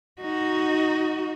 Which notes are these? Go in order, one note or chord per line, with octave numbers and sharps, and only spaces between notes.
D#4 F#4